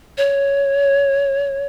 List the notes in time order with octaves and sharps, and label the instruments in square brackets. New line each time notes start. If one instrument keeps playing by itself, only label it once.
[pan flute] C#5